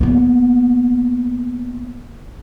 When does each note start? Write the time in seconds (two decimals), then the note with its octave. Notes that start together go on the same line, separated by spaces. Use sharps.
0.01 A#3 B3